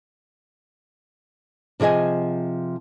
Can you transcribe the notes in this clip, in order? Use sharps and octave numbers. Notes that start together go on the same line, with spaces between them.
C3 F3 G#4 D#5 G#5